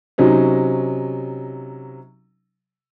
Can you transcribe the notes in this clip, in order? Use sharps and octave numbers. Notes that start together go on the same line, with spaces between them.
C3 F#3 C#4 D#4